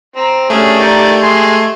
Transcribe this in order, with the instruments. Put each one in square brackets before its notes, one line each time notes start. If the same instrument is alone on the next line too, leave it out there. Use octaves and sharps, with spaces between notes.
[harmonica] C4 [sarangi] A#5
[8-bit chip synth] A3 [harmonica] C#4 D4 G#4 [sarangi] G4
[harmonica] D#3 A#4 D5
G#3 G#5 C6